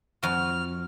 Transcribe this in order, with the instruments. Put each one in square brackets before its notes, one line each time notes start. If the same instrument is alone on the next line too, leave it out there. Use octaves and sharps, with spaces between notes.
[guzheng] F2 F#4 [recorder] F6